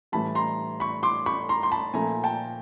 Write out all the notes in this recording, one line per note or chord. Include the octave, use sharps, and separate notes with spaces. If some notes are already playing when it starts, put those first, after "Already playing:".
A2 E3 G3 A5 B5
A#5 C6
B5 C#6
C6 D6
B5 C#6
A#5 C6
C6
A5 B5
A#2 F3 A3 G#5 A#5
G5 A5